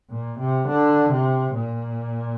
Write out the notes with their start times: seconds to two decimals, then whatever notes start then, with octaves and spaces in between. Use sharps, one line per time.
0.10 A#2
0.39 C3
0.68 D3
1.11 C3
1.54 A#2